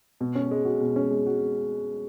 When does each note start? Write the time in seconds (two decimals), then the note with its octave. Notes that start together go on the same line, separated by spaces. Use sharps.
0.21 B2
0.35 C#4
0.51 G#3
0.65 F#4
0.81 B2
0.96 C#4
1.11 G#3
1.27 F#4